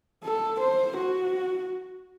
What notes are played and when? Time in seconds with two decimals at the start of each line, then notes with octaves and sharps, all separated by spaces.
0.24 A4
0.60 C5
0.97 F#4